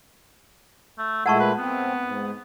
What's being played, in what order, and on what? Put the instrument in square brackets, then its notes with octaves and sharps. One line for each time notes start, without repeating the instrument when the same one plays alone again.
[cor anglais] A3
[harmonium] A#2 G#3 A3 [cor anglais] E4 [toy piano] F#5 A5 C#6
[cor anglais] B4
[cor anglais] B3 [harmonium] C4
[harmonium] G#2